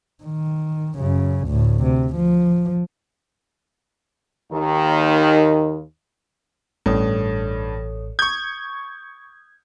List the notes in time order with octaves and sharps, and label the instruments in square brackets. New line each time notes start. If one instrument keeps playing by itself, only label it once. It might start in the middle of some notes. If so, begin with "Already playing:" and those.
[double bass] D#3
F#2 C#3
D2 A2
C3
F3
[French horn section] D#2 D#3
[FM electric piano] A1 [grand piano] G2 [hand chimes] A4 C#5 D#6
[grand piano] C#6 G6 [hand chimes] D#6 [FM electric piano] G#6